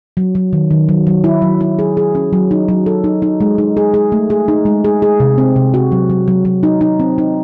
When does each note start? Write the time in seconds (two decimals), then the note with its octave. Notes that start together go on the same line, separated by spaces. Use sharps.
0.17 F#3
0.35 F#3
0.53 D#3
0.71 D#3
0.89 F#3
1.07 F#3
1.24 E4
1.42 F#3
1.61 E4
1.79 G#4
1.97 G#4
2.15 C#4
2.33 F#3
2.51 D#4
2.68 F#3
2.86 A4
3.04 D#4
3.22 D#4
3.41 G#3
3.58 D#4
3.77 G#4
3.94 G#4
4.12 A3
4.30 G#4
4.48 D#4
4.65 G#3
4.84 G#4
5.02 G#4
5.20 C3
5.38 C4
5.56 C3
5.74 F#4
5.92 F#3
6.10 F#3
6.28 F#3
6.45 F#3
6.63 D#4
6.81 D#4
7.00 C4
7.18 D#4